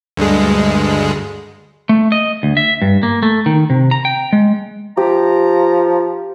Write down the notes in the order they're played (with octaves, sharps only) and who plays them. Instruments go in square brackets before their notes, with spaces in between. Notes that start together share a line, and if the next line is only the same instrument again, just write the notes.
[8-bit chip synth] D2 G2 G#3
[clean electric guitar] A3
D#5
D2
E5
G2
A#3
A3
D#3
C3
A#5
G5
G#3
[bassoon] F3 [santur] G4 [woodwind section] A#5